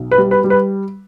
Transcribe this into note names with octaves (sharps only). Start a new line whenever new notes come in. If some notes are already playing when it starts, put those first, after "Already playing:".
Already playing: B1
B4
G3
B4
G3
B4